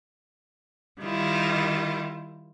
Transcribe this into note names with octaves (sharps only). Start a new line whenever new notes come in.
D#3 G3 E4 F4